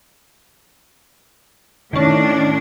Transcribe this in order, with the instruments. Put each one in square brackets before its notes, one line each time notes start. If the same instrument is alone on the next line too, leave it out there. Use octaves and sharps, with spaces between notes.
[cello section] A2 D4 [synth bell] D#3 C#4